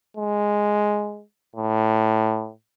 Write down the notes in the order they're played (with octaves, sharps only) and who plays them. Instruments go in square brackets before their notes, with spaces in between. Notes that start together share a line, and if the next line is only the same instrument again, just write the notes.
[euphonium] G#3
A2